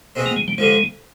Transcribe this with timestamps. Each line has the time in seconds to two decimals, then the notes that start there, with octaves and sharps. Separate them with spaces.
0.16 B2 G#3 C4
0.26 A#3
0.37 G#3
0.48 G3
0.58 G2 D3 F3 G#3